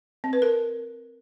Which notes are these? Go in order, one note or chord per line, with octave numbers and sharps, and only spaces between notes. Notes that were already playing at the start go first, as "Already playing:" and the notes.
C4
B4
A#4